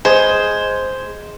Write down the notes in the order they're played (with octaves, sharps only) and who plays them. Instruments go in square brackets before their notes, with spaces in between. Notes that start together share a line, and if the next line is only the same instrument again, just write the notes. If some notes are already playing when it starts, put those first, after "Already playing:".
[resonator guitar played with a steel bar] G#3 [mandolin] C5